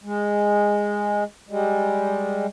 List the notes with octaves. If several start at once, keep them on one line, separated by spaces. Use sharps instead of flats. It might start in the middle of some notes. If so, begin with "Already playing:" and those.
G#3
G3 G#3